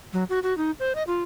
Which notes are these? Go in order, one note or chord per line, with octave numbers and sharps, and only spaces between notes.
F#3
F#4
F#4
D#4
C5
D#5
F4